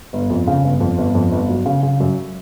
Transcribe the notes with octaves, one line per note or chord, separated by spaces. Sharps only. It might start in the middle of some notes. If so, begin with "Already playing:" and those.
G1
F2
C#3
G1
F2
G1
F2
G1
F#3
C#3
C#3
F#2